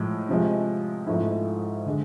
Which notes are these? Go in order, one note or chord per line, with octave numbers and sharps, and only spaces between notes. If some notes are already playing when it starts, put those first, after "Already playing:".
Already playing: A2 F3 G#3
C3 F3 G#3
G#2 F3 A3 E4
D3 G#3